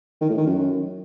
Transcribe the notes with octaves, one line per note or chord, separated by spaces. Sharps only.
D#3
A2
D#3
F#2